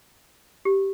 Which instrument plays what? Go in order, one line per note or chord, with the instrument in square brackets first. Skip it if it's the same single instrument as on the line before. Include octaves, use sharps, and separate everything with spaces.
[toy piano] G4